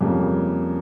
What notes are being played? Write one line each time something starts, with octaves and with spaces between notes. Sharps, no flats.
F2 C#3 G3 A#3